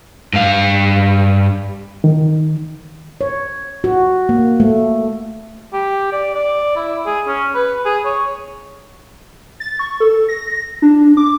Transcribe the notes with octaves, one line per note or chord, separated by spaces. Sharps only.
G2 F5
D#3
C#5
F#4
A#3
A3
G4
D5
D5
E4
G#4
C#4
B4
G#4
C#5
A6
C#6
A4
A#6
D4
D6